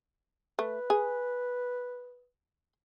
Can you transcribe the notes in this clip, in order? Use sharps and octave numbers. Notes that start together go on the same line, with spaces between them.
A3 B4
G#4